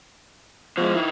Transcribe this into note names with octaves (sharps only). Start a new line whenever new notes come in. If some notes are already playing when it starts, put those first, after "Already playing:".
B2 F3 G#3
D#3 E4